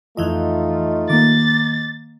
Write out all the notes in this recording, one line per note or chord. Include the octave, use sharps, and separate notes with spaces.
F2 E3 A3 D#4 F4 D#5
D#3 A#3 D6 A6